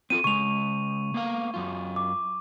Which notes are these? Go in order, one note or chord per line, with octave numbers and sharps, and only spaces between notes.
C4 F4 A4 D#7
C#3 G#3 C#6 F7
A#3 B3 F5
F#2 F4
D6